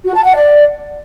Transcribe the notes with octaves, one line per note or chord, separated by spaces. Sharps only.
F#4
A5
F#5
D5